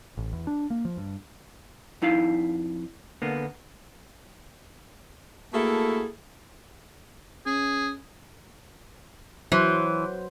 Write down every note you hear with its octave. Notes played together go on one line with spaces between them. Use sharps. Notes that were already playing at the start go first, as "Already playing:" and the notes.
A1
E2
D4
A#3
F3
G2
F2 D#4 E4 F5
D3 A#3 B3
A3 A#3 E4 F#4 G#4 A4
C#4 G#4
E3 F#3 C5